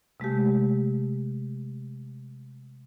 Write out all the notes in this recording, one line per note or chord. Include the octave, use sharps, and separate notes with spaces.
C3 G#3 A3 G4